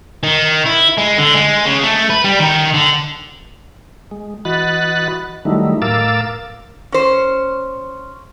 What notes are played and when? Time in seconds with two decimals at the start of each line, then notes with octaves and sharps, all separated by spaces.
0.23 D#3
0.66 E4
0.98 G#3
1.18 D3
1.35 G#3
1.66 C#3
1.83 A3
2.10 B4
2.24 G3
2.39 D#3
2.74 D3
4.11 G#3
4.45 E3 F#4 D#5 B5 F#6 A6
5.45 D#3 F#3 G3 A3 D#4 E4
5.82 A2 A#4 F5 D6 E6 A6
6.92 C#4 C5